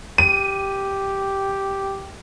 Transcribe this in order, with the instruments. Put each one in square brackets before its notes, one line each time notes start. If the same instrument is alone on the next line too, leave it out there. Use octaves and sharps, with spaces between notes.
[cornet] G4 [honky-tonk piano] D#7